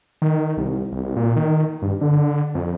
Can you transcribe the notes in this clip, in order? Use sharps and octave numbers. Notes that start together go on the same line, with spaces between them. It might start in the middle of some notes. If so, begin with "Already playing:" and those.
D#3
C2
C2
A#2
D#3
G2
D3
F2